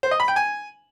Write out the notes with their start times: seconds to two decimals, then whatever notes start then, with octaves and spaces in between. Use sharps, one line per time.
0.03 C5
0.11 D#5
0.20 B5
0.28 G5
0.36 G#5